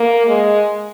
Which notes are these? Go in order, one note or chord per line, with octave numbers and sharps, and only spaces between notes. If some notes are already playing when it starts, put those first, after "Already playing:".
Already playing: A#3
G#3